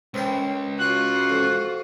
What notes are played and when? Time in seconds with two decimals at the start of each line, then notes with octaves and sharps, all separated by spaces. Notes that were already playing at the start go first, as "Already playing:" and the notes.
0.14 C#2 C4 A#4 G5
0.79 F4 F#4 F#6
1.30 F2